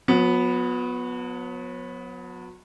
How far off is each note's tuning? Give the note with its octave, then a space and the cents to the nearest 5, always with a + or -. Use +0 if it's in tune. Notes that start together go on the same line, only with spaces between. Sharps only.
F#3 -40 B3 +0